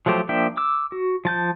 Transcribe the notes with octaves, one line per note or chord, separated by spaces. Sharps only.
F3 F#3 A3 G4 C5
F3 A#3 D4 E5 G5
D6 E6
F#4
F3 A5 G6